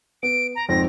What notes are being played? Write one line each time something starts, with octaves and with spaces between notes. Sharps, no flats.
B3 D7
A#5
G#1 F2 C4 A#6